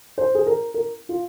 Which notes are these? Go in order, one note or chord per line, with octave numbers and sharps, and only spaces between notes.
C5
G#4
A#4
A#4
F4